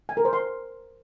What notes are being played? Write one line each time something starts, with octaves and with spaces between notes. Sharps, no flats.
G#5
A#4
C5
C6